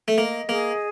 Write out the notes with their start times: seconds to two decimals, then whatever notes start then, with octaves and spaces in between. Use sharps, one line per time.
0.08 A3
0.18 A#3 D#5
0.49 A#3 G#4